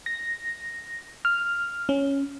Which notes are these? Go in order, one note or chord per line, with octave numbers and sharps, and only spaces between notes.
A#6
F6
C#4